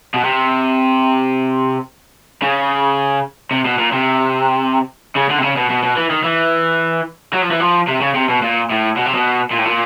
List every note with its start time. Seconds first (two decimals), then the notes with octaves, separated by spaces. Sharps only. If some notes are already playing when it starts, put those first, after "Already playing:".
0.14 B2
0.24 C3
2.42 C#3
3.51 C3
3.65 B2
3.79 A#2
3.93 C3
5.15 C#3
5.29 D3
5.38 C3
5.42 C#3
5.56 B2
5.69 B2
5.83 B2
5.97 E3
6.11 D#3
6.24 E3
7.33 F#3
7.42 F3
7.51 E3
7.60 F3
7.88 C3
8.01 C#3
8.15 C3
8.29 B2
8.42 A#2
8.70 A2
8.96 B2
9.06 C3
9.14 B2
9.51 A#2
9.59 A2
9.66 A#2